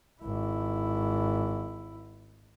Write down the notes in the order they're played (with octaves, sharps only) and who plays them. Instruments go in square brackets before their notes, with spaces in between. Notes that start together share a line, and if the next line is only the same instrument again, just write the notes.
[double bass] G#1 E4